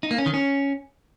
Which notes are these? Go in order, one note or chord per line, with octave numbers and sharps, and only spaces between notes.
D#4
A#3
C#4
D#3
C#4